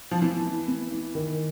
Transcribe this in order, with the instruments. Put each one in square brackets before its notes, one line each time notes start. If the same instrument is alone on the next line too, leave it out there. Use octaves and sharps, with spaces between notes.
[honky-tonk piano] F3
[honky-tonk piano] E3 [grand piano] B3
[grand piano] E4
B3
E4
D#3